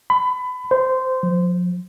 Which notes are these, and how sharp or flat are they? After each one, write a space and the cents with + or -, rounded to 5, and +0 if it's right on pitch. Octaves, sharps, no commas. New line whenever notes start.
B5 +25
C5 -15
F3 +40